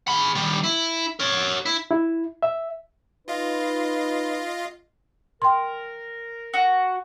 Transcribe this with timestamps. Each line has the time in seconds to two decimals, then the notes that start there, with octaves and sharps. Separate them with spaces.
0.08 G#4 B5
0.35 D#3 G3
0.64 E4
1.20 A#4 C#5
1.66 E4
1.91 E4
2.43 E5
3.28 D#4 F4 B4 D#5 F5
5.42 A#4 G5 C6
6.54 F#4